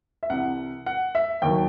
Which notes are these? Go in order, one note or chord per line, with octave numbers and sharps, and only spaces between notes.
E5
C2 C3 E3 F#5
F#5
E5
D#2 D#3 F#3 G5